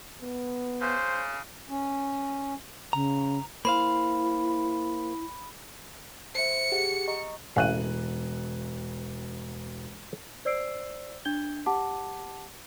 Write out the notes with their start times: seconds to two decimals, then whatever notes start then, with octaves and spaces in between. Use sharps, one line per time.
0.22 B3
0.82 C#3 C5
1.70 C#4
2.93 C#3 A#5
3.65 A#3 E4 C5 F5 B5
6.35 C5 E5 C#7
6.72 G4 G#4 F#5
7.08 D#5 A#5 C#6
7.56 E1 A1 C#4 F5 F#6 D#7
10.45 C5 D5 E6 C7 D7
11.25 D4 G6 G#6 G7
11.66 G4 F#5 A5 D6